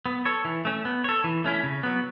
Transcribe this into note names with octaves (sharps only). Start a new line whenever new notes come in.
B3
A4 C#5
E3
A3 C#4
B3
A4 C#5
E3
A3 C#4 E4
C#3
F#3 B3